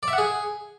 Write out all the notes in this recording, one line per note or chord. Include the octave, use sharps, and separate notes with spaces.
D5
E5
F#5
G#4